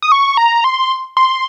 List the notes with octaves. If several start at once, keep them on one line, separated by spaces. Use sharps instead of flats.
D#6
C#6
A#5
C6
C6